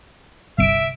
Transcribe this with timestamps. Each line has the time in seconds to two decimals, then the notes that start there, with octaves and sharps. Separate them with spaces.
0.58 G1 C2 E5 D7